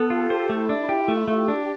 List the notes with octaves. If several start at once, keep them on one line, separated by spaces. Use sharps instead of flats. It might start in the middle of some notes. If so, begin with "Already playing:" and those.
Already playing: B3 A4
F4 G4
C5
A3 E4
D4
F4 G4
A3
A3 G4
D4